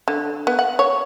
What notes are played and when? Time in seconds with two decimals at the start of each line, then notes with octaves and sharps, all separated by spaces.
0.08 D3
0.47 B3
0.59 F#5
0.79 C#5